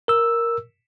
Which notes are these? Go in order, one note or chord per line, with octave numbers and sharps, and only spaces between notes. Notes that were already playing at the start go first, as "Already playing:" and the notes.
A#4 E6